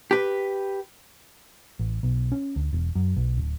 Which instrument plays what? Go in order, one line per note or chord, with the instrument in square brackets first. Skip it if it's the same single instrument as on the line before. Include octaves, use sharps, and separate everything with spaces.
[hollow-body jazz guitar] G4 B4
[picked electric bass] A1
B1
C#4
D2
E1
F#2
B1
D1